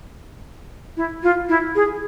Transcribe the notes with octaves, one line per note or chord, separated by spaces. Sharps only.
E4
F4
E4
G#4